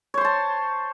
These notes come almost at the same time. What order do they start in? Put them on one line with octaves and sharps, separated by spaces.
C#5 C5 C6 A5